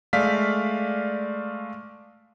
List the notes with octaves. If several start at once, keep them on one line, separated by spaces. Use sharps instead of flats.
G#3 A3 D5 F5 B6